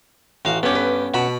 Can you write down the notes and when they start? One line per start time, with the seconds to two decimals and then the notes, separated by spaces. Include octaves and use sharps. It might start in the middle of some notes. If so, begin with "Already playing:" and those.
0.45 A1 F#4 F5
0.63 G2 B3 C#4 G4 A4
0.75 B4
1.14 B2 F#5 A5 B5